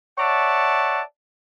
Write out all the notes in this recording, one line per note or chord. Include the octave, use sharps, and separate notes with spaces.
C#5 D5 E5 F#5 A5